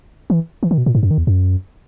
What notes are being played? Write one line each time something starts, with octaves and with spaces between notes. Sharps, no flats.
E3
E3
D#3
B2
A#2
G#2
F#2
D#3
E2
F#2